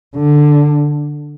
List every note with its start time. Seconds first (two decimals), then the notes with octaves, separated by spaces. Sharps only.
0.16 D3